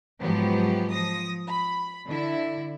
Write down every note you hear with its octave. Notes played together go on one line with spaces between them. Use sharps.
G#2 F3 F#3 B3 G4
F3 D#6 A#6
B5
D3 E4